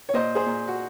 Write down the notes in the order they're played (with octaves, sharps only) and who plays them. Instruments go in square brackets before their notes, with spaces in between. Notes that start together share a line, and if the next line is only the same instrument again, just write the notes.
[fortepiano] C#5
A#2 C5 D#5
G#4 C5
A#2
F#4